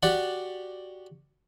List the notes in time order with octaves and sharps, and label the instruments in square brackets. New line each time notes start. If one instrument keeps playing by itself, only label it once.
[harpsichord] F#4 G4 D5 F#5